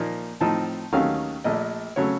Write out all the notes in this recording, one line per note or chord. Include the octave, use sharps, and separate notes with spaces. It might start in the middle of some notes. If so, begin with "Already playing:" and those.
Already playing: A#2 F3 A#3 D#4
A2 F3 C4 D#4 A5
D#2 D#3 F#3 A3 C#4 F5
A#1 A#2 A3 D#5
C#3 F#3 A3 C#5